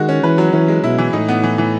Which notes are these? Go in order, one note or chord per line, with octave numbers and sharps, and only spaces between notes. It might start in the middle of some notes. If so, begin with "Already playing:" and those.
Already playing: D#3 G#3 F#4
C#4
E3 B4
F#3
E3 C#4
G#3
B2 E4
E3
A2 D#4
B3
E3
E3